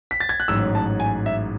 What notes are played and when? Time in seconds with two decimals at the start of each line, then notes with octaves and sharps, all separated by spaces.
0.11 B6
0.20 A6
0.29 G#6
0.40 F#6
0.48 A1 G#2 F#3 E6
0.75 A5
1.00 G#5
1.26 E5